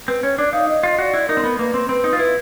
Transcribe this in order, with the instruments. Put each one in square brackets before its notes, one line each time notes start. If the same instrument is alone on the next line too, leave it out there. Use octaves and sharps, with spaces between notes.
[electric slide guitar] C4 [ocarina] B4
[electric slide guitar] C#4 [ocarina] C#5
[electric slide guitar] D4 [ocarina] D5
[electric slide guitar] D#4 [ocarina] F5
[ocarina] D#5
[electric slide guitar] F4
[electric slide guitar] F#4 [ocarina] D5 D#5
[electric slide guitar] E4
[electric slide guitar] D#4 [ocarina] A#4
[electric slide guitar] C4
B3
[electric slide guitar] A#3 [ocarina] B4
[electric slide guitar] C4
[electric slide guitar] C4 [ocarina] B4
[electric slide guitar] D#4
F4
[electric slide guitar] E4 [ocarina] B4